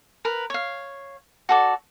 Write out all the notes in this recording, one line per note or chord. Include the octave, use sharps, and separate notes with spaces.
A#4 B4
C#5 F5
F#4 A4 D5